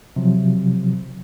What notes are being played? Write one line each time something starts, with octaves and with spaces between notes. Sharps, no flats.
C3 F3 F#3